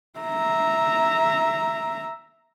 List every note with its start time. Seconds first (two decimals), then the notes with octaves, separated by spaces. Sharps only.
0.20 E5 A#5